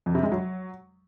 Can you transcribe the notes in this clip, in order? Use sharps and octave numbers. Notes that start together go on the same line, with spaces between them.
F2
C3
G#3
F#3